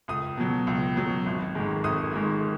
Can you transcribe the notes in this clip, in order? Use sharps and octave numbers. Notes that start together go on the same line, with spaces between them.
C#2 D#6
B2 F#3
C#2
B2 F#3
G#1
G#2 D#3 G#3
G#1 D#6
G#2 D#3 G#3